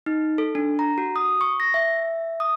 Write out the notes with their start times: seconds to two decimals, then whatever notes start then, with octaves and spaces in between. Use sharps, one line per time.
0.06 D#4
0.38 A4
0.55 D4
0.79 A#5
0.98 F#4
1.16 D#6
1.41 C#6
1.60 A#6
1.74 E5
2.40 D#6